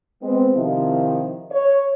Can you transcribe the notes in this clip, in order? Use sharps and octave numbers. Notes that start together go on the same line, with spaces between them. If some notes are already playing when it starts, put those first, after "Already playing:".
G#3 B3 C4
C3 D#3 F3 E4
C#5